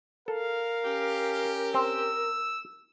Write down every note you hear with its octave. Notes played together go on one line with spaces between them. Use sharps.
A4 A#4 F5
C#4 G4
C4 E6